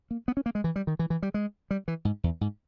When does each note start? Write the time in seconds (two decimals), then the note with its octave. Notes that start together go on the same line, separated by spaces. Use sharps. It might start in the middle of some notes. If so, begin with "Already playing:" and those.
0.11 A#3
0.28 B3
0.37 C#4
0.46 A#3
0.55 G#3
0.64 E3
0.76 G3
0.87 D#3
0.99 E3
1.10 E3
1.23 G3
1.34 G#3
1.71 G3
1.88 E3
2.05 G#2
2.24 E2
2.41 G#2